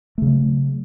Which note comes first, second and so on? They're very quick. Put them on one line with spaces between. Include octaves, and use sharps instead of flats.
A3 C#3 F#3